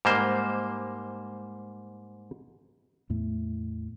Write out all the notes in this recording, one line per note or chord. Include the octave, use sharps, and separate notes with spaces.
G#2 G3 A#3 C5
E2 A2 A3